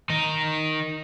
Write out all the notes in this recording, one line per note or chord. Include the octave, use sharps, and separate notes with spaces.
D#3 D#4